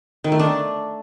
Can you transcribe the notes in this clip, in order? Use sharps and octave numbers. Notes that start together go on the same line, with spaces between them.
D#3
A3
D4